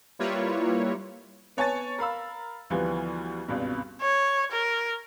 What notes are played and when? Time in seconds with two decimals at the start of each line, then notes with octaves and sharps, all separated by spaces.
0.19 G3 A#3 E4 F4 B4 C#5
1.57 B3 C#5 G#5 A5 A6
1.98 A#4 F5 B5 E6
2.70 D2 E3 F3 G3 B3
3.48 G#1 C#2 G2 B2
4.01 C#5
4.52 A#4